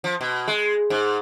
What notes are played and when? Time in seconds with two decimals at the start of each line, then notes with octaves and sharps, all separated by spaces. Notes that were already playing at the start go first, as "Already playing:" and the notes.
0.04 F3
0.21 B2
0.48 G#3
0.90 G#2